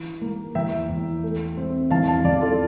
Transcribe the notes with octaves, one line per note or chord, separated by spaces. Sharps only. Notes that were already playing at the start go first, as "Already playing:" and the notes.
Already playing: E3
A#3
E2 E5 G5
E2
A3
C4
E2 F5 A5
F5 A5
E2 D5 F5
F4 A4